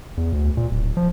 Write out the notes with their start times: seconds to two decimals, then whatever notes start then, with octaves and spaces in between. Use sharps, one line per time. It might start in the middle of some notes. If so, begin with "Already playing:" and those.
0.17 E2
0.33 D2
0.57 A#2
0.71 D1
0.97 F3